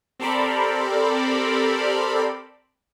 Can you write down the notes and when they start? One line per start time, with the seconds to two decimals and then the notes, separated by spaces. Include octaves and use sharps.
0.19 C4 G4 A4 A#4 D5 B5